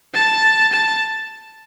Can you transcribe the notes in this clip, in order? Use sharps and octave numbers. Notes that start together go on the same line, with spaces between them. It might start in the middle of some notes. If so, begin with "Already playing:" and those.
A5
A5